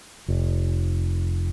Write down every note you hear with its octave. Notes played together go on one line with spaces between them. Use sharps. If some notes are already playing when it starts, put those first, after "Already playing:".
F1